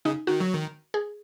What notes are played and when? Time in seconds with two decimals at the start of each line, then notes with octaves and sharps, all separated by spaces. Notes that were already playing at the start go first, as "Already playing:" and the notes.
0.05 C#3 D#4
0.27 D#3 F#4
0.40 F#3
0.54 D#3
0.94 G#4